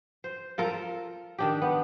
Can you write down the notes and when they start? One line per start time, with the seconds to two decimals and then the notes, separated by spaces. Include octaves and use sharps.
0.24 C5
0.58 F4 A4 A#4
1.38 D#3 D4 G4
1.62 B3